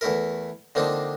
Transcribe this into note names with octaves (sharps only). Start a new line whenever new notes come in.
E2 A3 E4 A#4
D3 F3 A#3 C4 D4 D#4